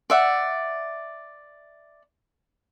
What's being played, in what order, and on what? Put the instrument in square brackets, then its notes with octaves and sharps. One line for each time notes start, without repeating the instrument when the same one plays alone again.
[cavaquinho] D5 E5 F#5